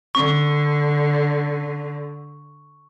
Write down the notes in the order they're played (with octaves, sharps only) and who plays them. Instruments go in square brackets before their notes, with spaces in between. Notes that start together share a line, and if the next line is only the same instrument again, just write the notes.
[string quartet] D3 [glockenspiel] C#6